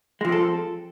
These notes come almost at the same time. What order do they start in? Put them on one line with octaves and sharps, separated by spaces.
G#3 F3 C4 A4